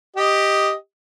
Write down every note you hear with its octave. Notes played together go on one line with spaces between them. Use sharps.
G4 D#5